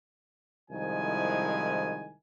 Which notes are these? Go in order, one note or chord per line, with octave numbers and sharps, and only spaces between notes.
C2 D#3 F3 G#3 E4 G#5